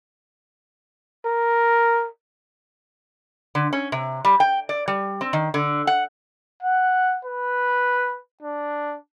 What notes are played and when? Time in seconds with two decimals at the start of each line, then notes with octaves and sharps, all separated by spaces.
1.25 A#4
3.55 D3
3.73 C#4
3.92 C3
4.25 G3
4.40 G5
4.69 D5
4.88 G3
5.21 C4
5.33 D#3
5.54 D3
5.87 F#5
6.63 F#5
7.25 B4
8.43 D4